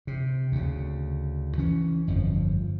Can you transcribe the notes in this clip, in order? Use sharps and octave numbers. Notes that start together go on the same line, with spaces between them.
C3
D2 C#3
E3 C#4
G1 F2 F3